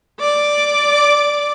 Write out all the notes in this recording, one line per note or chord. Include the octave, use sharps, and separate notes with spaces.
D5 D6